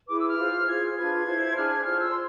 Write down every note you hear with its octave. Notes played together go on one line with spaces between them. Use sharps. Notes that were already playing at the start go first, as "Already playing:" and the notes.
E4 G#4 B4 D6
E6
F6
F4 G#4 C5
F4 G#4 C5 G#6
D4 F4 B4 G#6
E4 A4 C5
D4 G#4 C5 F6
G#6
F4 A4 C5 F6
E6
C6